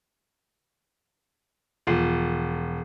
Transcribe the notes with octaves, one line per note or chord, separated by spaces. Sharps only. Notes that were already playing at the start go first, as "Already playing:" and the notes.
E1 F3